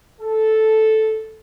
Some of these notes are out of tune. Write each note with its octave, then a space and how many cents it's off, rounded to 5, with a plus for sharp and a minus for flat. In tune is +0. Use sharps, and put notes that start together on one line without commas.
A4 -5